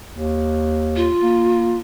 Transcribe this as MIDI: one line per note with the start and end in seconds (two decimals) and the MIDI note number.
0.11 1.09 39
0.96 1.76 65
1.23 1.79 58